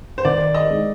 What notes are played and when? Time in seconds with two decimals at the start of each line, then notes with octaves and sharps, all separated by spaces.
0.18 C5
0.25 D#3 D5
0.54 D#5
0.70 G#3 D#4